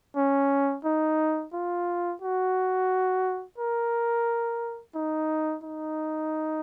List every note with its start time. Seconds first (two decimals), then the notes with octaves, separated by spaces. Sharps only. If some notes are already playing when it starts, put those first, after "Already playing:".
0.16 C#4
0.85 D#4
1.54 F4
2.22 F#4
3.58 A#4
4.95 D#4
5.63 D#4